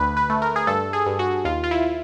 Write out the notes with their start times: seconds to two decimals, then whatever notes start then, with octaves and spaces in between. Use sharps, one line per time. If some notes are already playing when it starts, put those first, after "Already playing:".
Already playing: D2 B4
0.17 B4
0.30 A3
0.42 A#4
0.56 G#4
0.67 G2 A4
0.93 G#4
1.06 G2
1.19 F#4
1.45 D#2 F4
1.64 F4
1.71 E4